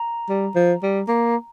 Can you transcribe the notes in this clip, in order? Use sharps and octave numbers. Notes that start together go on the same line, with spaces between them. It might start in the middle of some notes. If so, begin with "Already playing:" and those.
Already playing: A#5
G3
F3
G3
A#3